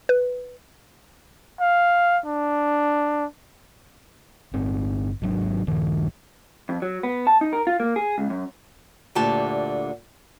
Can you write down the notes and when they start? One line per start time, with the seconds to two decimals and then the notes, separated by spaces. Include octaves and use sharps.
0.09 B4
1.60 F5
2.26 D4
4.53 G1 C4
5.21 G#1 F#3 D4
5.67 D#1 A#1 G2 D#3
6.69 F2
6.82 F#3
7.03 B3
7.27 A5
7.41 D#4
7.53 A#4
7.67 F4
7.80 A#3
7.96 G#4
8.18 C#2
8.30 F#2
9.15 D2 A#2 D3 G4 A5